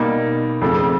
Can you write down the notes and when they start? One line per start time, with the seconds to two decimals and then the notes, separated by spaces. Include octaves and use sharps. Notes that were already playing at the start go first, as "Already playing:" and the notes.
Already playing: B2 G3 A#3 D#4
0.61 F2 C#3 F3 A3